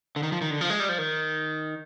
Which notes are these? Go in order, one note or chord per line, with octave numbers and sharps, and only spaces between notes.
D3
D#3
F3
D#3
D3
F3
G#3
G3
F3
D#3